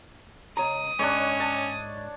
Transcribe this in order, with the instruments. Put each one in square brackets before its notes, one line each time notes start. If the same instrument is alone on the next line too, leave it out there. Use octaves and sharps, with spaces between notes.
[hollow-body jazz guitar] C#2 C#5 A#5 [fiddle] D#6
[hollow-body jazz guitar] G#2 G#3 [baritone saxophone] C#4 [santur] D4 C#5
[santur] A5